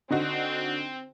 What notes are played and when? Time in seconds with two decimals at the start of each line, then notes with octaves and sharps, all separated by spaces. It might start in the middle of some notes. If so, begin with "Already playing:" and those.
0.10 D3 C4 D#4 F#4